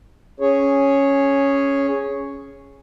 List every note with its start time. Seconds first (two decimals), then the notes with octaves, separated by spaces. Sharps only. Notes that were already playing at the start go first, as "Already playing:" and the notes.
0.40 C#4 G#4 C#5